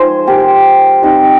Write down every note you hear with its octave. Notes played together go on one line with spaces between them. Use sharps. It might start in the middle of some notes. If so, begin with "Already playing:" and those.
Already playing: F3 G#3 D#4 G#4 C5
G4 A#4
G3 C4 D#4